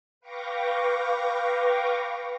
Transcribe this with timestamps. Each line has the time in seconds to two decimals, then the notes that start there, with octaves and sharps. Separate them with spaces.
0.21 B4 F5 G5 C#6 D6 A#6